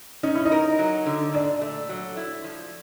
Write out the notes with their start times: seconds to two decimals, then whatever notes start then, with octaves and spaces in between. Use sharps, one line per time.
0.23 C#4 D#4
0.35 E4
0.45 D#4
0.52 A#4
0.79 F#3
1.06 D3
1.34 A#2 D4
1.62 A3
1.89 F#3
2.17 E4
2.44 F3